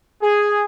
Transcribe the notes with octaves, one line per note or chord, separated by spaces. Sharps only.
G#4